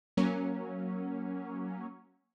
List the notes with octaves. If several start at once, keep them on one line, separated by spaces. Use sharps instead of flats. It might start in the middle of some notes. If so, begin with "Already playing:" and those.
F#3 A#3 C#4